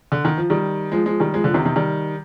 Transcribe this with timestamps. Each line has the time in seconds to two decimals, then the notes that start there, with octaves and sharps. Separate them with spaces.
0.12 D3
0.25 D#3
0.37 F3
0.50 D#3 G3
0.92 F3 G#3
1.06 F3 G#3
1.20 D#3 G3
1.34 F3 G#3
1.44 D3 F3
1.54 C3 D#3
1.65 C3 D#3
1.76 D#3 G3